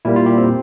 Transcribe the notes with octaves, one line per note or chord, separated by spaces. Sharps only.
A#2 G3 A#3 E4
F4
G4
C4